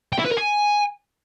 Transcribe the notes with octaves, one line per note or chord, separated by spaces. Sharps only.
G5
E4
B4
A#4
G#5